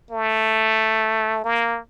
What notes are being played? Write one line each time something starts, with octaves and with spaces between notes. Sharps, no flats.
A3
A#3